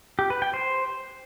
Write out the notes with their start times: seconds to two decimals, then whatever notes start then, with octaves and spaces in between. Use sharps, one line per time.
0.19 G4
0.30 B4
0.42 G5
0.54 C5